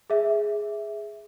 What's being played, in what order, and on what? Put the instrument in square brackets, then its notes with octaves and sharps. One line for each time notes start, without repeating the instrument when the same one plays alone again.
[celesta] G#4 E5